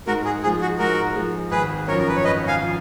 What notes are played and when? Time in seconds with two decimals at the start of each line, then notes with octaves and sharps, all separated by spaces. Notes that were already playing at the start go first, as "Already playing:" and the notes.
0.07 G#2 F#4 A#4
0.25 G#4
0.43 F3 G#3 G#4
0.61 F#4
0.79 G#2 F#4 A#4
1.15 F3 G#3
1.51 G#1 G#4 B4
1.88 F#2 F3 A#4 C#5
1.99 A#4
2.08 B4
2.16 C#5
2.24 G#1 B4 D#5
2.47 F5 G#5
2.60 F3